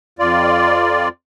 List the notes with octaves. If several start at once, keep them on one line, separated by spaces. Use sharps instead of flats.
F2 F4 D5